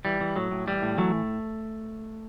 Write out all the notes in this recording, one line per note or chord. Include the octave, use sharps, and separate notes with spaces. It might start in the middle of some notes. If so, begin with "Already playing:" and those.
E3 G3
E3
A2 F#3
A2
E3 G3
A2
E3 F#3 A3
A2